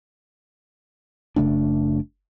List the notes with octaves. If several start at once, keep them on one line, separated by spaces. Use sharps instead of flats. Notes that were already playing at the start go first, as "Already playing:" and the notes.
F#1 C#3 A3 D4